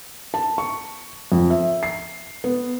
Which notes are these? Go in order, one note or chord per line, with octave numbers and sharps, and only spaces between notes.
A5
C#6
F2
E5
C7
B3